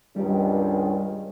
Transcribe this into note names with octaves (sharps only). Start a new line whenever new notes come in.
C#2 G2 D#3 G3